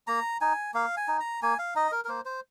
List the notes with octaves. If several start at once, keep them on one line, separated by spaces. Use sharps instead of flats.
A#3 A#5
D#4 G#5
A#3 F5
G#5
D#4
A#5
A#3 G#5
F5
D#4 D#5
A#4
A#4
A#3 C5
C5